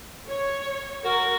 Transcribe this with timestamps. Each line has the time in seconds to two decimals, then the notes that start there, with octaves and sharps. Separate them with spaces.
0.28 C#5
1.04 F#4 A#4